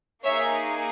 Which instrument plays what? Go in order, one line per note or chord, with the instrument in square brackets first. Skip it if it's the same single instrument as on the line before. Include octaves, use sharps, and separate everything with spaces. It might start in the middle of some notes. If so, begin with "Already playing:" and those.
[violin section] A#3 D#4 G#4 C#5 E5